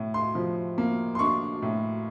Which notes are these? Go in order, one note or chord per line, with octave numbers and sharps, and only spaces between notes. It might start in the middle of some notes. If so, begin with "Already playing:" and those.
Already playing: A2
C6
F3
A#3
C6
D4 C#6
A2